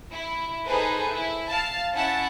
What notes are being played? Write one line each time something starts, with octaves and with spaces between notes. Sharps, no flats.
E4
D#4 G#4 A4 B4 C5
E4
F5 A5
C#4 E4 F#5 A5